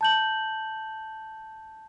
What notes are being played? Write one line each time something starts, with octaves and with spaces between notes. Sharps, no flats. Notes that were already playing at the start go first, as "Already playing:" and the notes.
A5 G6 F#7